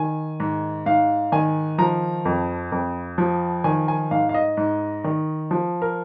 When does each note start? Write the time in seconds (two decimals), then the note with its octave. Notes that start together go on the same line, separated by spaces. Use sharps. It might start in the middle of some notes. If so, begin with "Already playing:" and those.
Already playing: D#3 G#5
0.40 G#2
0.86 G#2 F5
1.32 D#3 G#5
1.78 F3 A#5
2.25 F2
2.72 F2
3.18 F3
3.64 D#3 G#5
3.88 G#5
4.11 G#2 F5
4.29 F5
4.34 D#5
4.57 G#2
5.04 D#3
5.51 F3
5.82 A#4